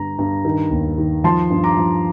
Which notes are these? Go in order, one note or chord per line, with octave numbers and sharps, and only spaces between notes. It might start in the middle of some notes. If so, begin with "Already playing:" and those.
Already playing: G2 D3 A#5
G2
D#3
D#2
D#3
F3 A5 C6
G2
A#5 D6
F3